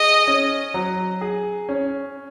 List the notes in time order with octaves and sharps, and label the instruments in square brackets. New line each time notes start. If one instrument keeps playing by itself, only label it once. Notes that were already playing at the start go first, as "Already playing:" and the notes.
Already playing: [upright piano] G#4 [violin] D#5
[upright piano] C#4
F#3
G#4
C#4